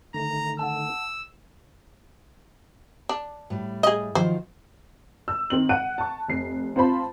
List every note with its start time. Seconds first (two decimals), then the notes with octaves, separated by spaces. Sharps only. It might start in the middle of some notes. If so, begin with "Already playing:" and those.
0.14 D3 D#3 A3 A#5
0.59 F#5 A5 E6
3.09 D4
3.50 A2 G3
3.83 G#4 D#5
4.15 D#3 F3 F#3 C5
5.28 E6
5.50 D#3 C4 F#7
5.69 F#5 F#6 D7 D#7
5.98 A5 C#6
6.28 F1 C7
6.76 C4 F4 C5 A5 B5